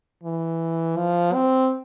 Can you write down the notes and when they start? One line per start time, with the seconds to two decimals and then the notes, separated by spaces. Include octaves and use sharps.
0.23 E3
0.97 F3
1.33 C4